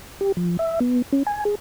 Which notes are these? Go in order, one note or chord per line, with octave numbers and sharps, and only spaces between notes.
G4
F3
E5
B3
C#4
G#5
G#4